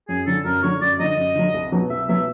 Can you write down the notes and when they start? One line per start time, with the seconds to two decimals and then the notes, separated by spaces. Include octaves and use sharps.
0.09 F#2 G#4
0.26 D3 F#3 A4
0.45 F#2 A#4
0.63 D3 F#3 C#5
0.81 F#2 D5
0.99 D3 F#3 D#5
1.17 F#2
1.35 D3 F#3
1.54 C2
1.72 B2 F#3 B3
1.90 C2 E5
2.08 B2 F#3 B3 E5